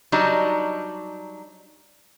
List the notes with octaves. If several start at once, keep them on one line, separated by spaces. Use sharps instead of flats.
F#3 G3 D4 D#4